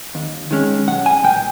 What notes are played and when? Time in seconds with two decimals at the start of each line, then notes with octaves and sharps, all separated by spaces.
0.15 D#2
0.51 D#3 G#3 C#4
0.88 B1 F#5
1.06 G#5
1.24 A#2 F#3 G5